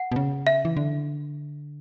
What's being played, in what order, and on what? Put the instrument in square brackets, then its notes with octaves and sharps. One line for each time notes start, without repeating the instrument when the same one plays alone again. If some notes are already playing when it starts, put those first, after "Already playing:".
Already playing: [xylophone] F#5
[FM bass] B2
C#3
[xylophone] E5
[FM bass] E3
D3